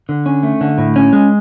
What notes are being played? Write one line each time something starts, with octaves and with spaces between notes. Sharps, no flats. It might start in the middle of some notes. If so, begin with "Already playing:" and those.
D3
C#4
A3
D3
A2
C#4
G#3